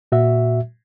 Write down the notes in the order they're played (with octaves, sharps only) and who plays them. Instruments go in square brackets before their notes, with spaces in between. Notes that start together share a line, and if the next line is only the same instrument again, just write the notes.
[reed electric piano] A#2 F#4 E5